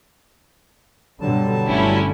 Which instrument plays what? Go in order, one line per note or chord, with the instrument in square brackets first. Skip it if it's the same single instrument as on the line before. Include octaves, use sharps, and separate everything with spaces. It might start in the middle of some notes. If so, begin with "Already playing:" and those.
[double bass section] G2 B2 D3 [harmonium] F#3 G3 A5
[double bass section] G1 D3 [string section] A3 C#4 E4